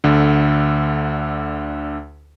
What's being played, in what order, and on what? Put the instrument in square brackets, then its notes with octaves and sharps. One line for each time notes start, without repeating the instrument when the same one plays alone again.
[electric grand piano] D2 D3